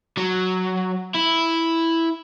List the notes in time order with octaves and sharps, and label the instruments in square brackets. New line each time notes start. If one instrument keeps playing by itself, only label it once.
[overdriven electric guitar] F#3
E4